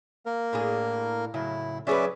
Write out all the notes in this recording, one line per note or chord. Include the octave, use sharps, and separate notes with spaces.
A#3 A#4
A2 D4 G#4
A2 C#3 F#3 E4
F#3 C#4 G#4 B4 D5 E5